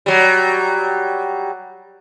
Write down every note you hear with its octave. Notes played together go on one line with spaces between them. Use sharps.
F#3 G3